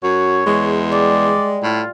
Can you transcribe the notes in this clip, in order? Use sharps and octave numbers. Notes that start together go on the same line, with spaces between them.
F#2 F#4 C#5
E2 G#3
G3 D5
A2 F4